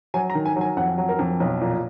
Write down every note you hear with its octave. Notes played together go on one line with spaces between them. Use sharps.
F#3 G#5
A#5
D#3
G#5
F#3
G#5
F2 F#5
F#3
A#4
F2
B1
A#2